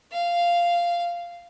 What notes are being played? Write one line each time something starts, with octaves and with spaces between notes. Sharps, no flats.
F5